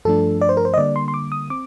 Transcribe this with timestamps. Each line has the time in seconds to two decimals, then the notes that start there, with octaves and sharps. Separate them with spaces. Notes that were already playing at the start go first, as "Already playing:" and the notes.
0.05 G2 F3 A3 D4 A4
0.41 D5
0.49 C5
0.57 A#4
0.65 C5
0.74 D#5
0.77 D3 G3 A#3 D5
0.96 C6
1.08 C6
1.14 D6
1.32 D#6
1.50 C4 D6